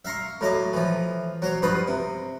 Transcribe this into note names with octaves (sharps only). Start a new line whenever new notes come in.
E5 F5 A#5 C6 C#6
A2 F#3 D#5 D6
E3 F3
F#3 C5 C#5
G2 F3 B4 C6 D#6
C3